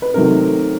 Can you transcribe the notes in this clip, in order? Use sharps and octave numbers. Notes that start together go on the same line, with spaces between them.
B4
C3 D#3 F#3 A3 A#4